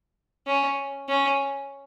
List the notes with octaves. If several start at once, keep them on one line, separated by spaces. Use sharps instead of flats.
C#4
C#4